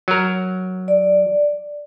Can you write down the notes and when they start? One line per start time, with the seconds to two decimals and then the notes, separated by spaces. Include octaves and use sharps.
0.08 F#3 A#4
0.88 D5